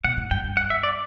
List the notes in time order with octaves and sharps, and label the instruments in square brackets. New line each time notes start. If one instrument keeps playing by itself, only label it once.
[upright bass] B2 [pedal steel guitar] F#5
[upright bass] A2
[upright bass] G2 [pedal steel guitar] G5
[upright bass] G2
[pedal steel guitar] F#5
E5
D5